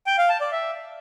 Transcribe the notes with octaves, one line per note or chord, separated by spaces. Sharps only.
G5
F5
A5
D5
E5